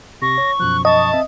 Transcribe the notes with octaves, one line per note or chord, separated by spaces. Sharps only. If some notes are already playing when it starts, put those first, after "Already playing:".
C3 C#6 A#6
C#5
F#2 B2 F3 F#6
D#5 A5 C#6
C4 E5